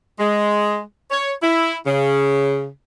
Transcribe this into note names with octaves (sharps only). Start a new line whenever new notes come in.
G#3
C#5
E4
C#3